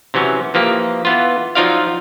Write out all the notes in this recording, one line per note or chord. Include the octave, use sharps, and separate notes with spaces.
C3 E3 F#3 C#4
E3 F3 A#3 G4
E3 B3 F4
F3 F#3 D#4 F4 D5 F5